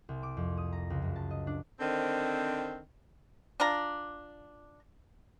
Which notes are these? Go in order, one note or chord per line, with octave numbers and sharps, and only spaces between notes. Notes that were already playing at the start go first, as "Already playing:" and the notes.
C2
D6
F2
D#6
A#5
C#2
F#2
A5
D#5
D4
D3 D#3 C4
D4 F4 A#5